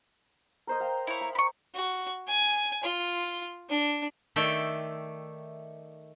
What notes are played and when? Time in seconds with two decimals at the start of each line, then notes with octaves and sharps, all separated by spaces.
0.67 A#4 C5 D#5
0.80 F5 G5 A#5
1.07 E4 C#5
1.21 A#5
1.35 B5 C#6
1.75 F#4
2.27 G#5
2.83 F4
3.69 D4
4.36 D#3 A3 D5 E5 G5